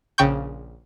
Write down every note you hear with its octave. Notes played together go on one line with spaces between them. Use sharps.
A#1 C#3 G5 C#6 G6